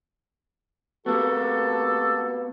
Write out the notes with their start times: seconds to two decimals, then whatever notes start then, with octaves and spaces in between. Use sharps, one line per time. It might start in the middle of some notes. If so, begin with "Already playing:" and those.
1.06 A#3 B3 F#4 G4 A4